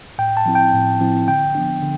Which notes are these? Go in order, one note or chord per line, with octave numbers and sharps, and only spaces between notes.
A2 G5
A5
F3 C4 E4
G5
A2
F3 C4 E4
D3 G5
F3 B3 D4
D3